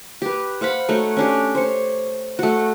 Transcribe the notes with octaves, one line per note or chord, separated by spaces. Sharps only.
G4 B4
C5 F5 F#5 B5
A3 D#4 F#4 C#5
C#4 D4 G4
C5 C#5
A3 F#4